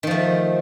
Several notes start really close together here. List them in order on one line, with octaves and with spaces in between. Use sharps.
D#3 F3 A3